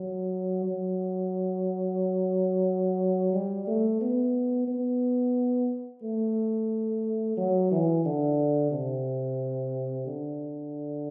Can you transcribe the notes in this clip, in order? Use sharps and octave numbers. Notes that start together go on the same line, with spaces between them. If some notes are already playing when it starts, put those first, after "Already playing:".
Already playing: F#3
F#3
G3
A3
B3
B3
A3
F#3
E3
D3
C3
D3